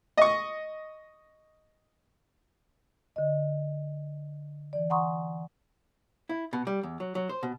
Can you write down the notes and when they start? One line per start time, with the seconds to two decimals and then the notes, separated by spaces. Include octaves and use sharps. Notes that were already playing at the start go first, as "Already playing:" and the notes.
0.17 D#5 C#6
3.16 D3 D#5
4.73 E3 D5
4.90 F#5 G#5 A#5 C6 C#6 D#6
6.29 E4
6.53 B2
6.67 G3
6.83 E2
7.00 F#3
7.15 F#3
7.29 C5
7.43 B2